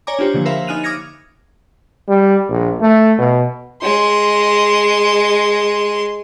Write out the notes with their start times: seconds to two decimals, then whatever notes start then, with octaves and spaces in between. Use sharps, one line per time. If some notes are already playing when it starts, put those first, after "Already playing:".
0.07 C#5 D5 G#5 A#5 D6
0.19 D4 F4 G4 C5
0.34 D3 F3 A#3
0.45 A#4 C5 E5 F5 B5
0.67 D#4 G#5 F6 F#6 D#7 F7
0.83 D6 D#6 F6 G#6 A#6 C#7
2.08 G3
2.49 A#1
2.81 A3
3.18 B2
3.82 G#3 C6